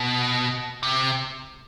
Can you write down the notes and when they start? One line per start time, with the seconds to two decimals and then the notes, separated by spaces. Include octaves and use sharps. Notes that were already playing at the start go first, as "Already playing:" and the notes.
Already playing: B2
0.83 C3